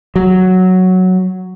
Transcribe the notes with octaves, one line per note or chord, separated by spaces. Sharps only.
F#3